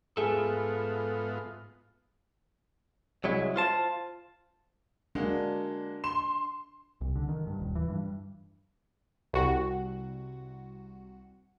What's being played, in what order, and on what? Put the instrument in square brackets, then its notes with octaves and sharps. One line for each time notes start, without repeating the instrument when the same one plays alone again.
[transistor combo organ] G#2 B3 F4 [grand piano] G#4 [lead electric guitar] A4 E5
[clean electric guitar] C2 F#3 G#3 E4
F4 C5 A5
[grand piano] G#3 A#3 F#4 [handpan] D4
[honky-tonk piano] C6 [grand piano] E7
[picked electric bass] C2
D3
D#3
G2
D#1
E3
G2
[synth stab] C2 F#4